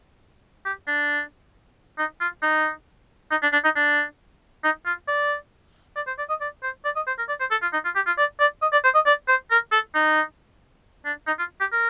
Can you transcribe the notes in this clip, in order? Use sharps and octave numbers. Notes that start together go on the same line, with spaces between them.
G4
D4
D#4
F4
D#4
D#4
D4
D4
D#4
D4
D#4
F4
D5
D5
C5
D5
D#5
D5
C5
D5
D#5
C5
A#4
D5
C5
A4
F4
D#4
F4
G4
F4
D5
D5
D#5
D5
C5
D#5
D5
C5
A#4
A4
D#4
D4
D#4
F4
G4
A#4